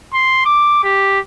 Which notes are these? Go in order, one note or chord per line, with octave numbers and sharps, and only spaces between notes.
C6
D6
G4